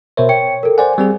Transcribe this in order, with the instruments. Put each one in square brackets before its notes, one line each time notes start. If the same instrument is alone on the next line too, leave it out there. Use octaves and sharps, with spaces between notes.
[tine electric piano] B2 C5 C#5 [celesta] A#4 E5
[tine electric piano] C#5 [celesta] G5 C#7
[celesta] A4 A#4
[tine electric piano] C5 D5 F#5 [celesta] G#5
[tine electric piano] G3 C4 G#4